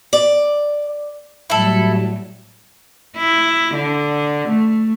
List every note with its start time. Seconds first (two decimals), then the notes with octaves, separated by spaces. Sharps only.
0.13 D5
1.50 A2 F#3 G3 E4 A4
3.17 E4
3.75 D3
4.49 A3